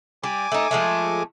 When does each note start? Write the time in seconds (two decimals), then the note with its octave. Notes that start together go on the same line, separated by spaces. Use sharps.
0.23 G3 G#5 D6
0.52 A3 D#4
0.71 F3 G#3 A3